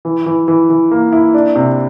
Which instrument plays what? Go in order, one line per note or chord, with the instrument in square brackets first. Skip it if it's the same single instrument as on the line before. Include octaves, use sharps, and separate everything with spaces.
[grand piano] E3
E3
E3
E3
A#3
E4
D4
C3